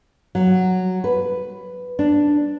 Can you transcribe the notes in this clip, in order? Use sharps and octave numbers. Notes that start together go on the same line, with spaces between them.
F#3
B4
D4